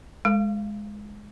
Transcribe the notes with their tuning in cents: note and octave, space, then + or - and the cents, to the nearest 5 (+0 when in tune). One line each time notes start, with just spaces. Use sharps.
G#3 +5 F5 -25